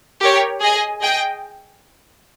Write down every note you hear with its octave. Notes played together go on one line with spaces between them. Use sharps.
G4 A#4 C#5
G#4 D#5 G#5
G#4 D#5 G5